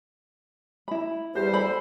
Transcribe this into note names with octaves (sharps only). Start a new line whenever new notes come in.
E4 B5
E2 G3 G4 C5
A4 B5